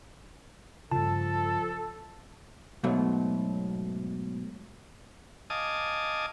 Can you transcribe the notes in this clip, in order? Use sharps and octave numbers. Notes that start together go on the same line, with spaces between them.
G2 C#3 F3 A4 A5
G#2 B2 F#3 A3
D#5 F5 G#5 A5 D6 D#6